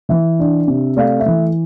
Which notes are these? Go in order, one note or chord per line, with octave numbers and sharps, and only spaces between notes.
E3 E5
D4
C3
A3 D5 F5
E5
E3